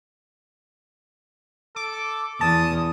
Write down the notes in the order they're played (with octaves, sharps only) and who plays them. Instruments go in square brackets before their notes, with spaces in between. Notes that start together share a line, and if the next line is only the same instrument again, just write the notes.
[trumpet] A4 [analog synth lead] D6
[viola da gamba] E2 [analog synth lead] A5 [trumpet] D#6